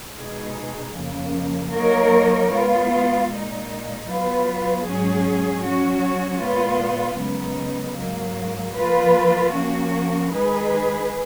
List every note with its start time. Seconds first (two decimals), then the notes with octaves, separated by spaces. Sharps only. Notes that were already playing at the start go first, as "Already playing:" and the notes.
0.17 B2 G#3 D#4 G#4
0.95 F2 C#3 F3 A#3
1.73 F#3 A#3 D#4 A#4 C#5
2.51 G#3 B3 F4
3.29 A#2 G#3 D#4
4.07 F#3 B3 F4 B4
4.85 G#2 F#3 C#4 G#4
5.63 F#3 C#4 F#4 C#5
6.41 A#2 G#3 B3 F4
7.19 F#2 C#3 G#3 B3 D#4
7.97 G#2 F#3 A#3
8.75 F3 A#3 F4 B4
9.53 F3 A#3 C#4 F#4
10.32 D#3 G#3 D#4 G#4 B4